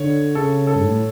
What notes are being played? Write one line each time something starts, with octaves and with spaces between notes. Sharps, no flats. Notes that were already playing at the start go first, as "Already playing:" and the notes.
Already playing: D3 C#5
C#3 A4
A4
G2
A2